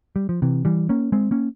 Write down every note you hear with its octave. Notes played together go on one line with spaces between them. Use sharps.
G3
F3
C3 E3
E3 G3
A#3 C#4
G#3 C4
A#3 C#4